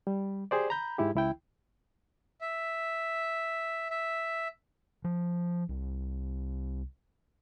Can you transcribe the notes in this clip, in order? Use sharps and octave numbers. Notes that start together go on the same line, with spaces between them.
G3
G4 G#4 C5 D5
A#5 B5 G6
G#2 G#3 E4 G4
C#2 E4 G5
E5
E5
F3
C2